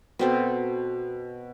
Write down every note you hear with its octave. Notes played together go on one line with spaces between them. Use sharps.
B2 C4 A4